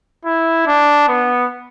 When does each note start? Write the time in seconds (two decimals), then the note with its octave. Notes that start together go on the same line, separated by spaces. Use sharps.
0.25 E4
0.67 D4
1.08 B3